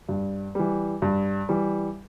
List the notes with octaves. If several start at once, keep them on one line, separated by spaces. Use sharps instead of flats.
G2
E3 G3
G2
E3 G3